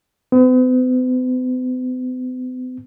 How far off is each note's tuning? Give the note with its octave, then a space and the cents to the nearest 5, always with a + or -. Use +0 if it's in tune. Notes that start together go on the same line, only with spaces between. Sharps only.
B3 +45